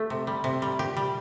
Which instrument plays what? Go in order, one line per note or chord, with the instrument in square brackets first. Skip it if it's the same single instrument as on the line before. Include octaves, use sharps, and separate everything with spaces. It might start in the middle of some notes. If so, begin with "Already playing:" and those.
Already playing: [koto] A3
C3
G3
C3
G3
A#2 G4
G3